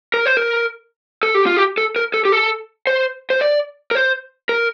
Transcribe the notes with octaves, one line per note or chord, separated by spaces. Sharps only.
A#4
C5
A#4
A4
G4
F4
G4
A4
A#4
A4
G4
A4
C5
C5
D5
A#4
C5
A#4